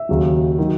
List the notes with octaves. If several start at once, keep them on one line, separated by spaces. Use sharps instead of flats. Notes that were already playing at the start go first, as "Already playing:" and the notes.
Already playing: E5
D#2 C#3 F#3
D#3 F#3